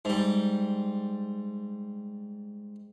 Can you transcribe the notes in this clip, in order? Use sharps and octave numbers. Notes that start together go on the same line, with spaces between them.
G#2 G3